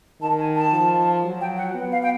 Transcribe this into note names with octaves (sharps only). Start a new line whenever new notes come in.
D#3 A5
G#5
A5
F3
F#3
G5
F#5
B3
F5
G5